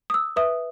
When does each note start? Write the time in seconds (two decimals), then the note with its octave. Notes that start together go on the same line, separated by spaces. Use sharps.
0.10 D#6
0.14 E6
0.36 B4 E5 D#6